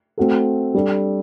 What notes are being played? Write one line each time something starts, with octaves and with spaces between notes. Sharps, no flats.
A3 C4 F#4 A4
G3 D4 A4